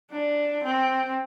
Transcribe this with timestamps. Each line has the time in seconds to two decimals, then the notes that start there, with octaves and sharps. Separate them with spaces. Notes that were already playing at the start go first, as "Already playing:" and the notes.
0.12 D4
0.64 C4